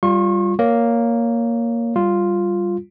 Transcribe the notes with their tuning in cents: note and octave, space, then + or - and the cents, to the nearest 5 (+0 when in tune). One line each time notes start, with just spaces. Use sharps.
G3 +0 F4 +0 C#6 -40
A#3 +0 C#5 +15
G3 +0 F4 +0